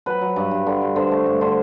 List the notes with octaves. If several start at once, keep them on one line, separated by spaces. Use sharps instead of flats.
F#3 B4
F#3
G2
G2
D3
G2
D3 C5
A3
G2
D3 C5